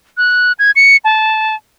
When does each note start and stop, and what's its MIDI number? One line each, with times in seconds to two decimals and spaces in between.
0.17 0.52 90
0.59 0.71 92
0.76 0.97 97
1.05 1.55 81